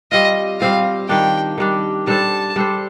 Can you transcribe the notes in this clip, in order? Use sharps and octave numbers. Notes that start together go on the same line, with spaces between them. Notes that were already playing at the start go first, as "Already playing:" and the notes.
G3 C4 F4 D#5
G3 C4 F4 F5
D#3 G3 D4 G5
D#3 G3 D4
G3 D4 A4 C5 A5
G3 D4 A4 C5